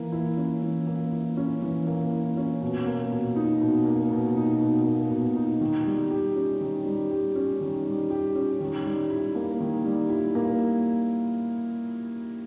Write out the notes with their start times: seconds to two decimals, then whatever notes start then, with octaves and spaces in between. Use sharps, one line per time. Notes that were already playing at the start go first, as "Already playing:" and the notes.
Already playing: E3 A#3
0.12 E4
0.37 C#4
0.62 E3
0.87 A#3
1.12 E4
1.37 C#4
1.62 E3
1.87 A#3
2.12 E4
2.37 C#4
2.62 B2
2.87 A#3
3.11 B2
3.36 D#4
3.61 B2
3.86 A#3
4.11 B2
4.37 D#4
4.61 B2
4.86 A#3
5.11 B2
5.36 D#4
5.61 D#3
5.86 G3
6.11 G4
6.36 C#4
6.61 D#3
6.85 G3
7.11 G4
7.36 C#4
7.61 D#3
7.86 G3
8.10 G4
8.35 C#4
8.60 D#3
8.85 G3
9.10 E4
9.35 A#3
9.60 D#3
9.85 G3
10.09 E4
10.35 A#3